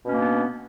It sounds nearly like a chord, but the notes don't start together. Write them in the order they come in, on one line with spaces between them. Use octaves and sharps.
B2 C#4 A#3 D4 B3